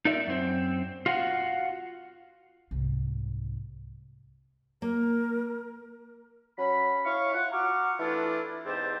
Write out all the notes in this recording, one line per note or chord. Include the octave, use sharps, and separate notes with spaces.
D#4 F4 A#4 D5 E5
F#2 C4
F4 F#4 F5 F#5
C2 G#2
A#3 A#4
F#3 C#4 B5
E4 C#5 F5 C#6
F4 F#5
F#4 A#5 C#6 D6 F6
E3 A3 D4 E4 F4
E2 G#2 C4 G4 A5